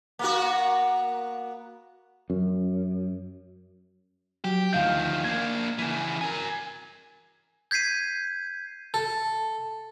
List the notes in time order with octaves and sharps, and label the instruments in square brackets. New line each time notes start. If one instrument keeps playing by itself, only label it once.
[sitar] A#3 B3 F#4
[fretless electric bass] F#2
[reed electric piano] F#3 [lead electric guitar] G4
[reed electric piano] D2 F5 G6 [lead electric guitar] D#3 F3
[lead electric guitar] A#3 D4 [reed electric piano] G#6
[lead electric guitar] C#3 E3
A#4 G#5
[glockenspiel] G6 G#6 B6 C7 D#7
[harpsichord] A4